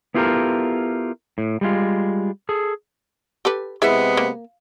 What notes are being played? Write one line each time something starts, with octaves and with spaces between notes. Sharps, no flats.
B3 E4 F4 G4 A4 A#4
A2
G3 G#3 F4
G#4 A4
G4 A4 B4
C3 G#3 B3 E4 G#4 E5
A#3